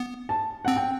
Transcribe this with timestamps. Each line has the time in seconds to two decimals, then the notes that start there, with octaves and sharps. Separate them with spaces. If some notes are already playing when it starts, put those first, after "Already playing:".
Already playing: B3
0.29 A5
0.65 C4 F#5
0.76 G5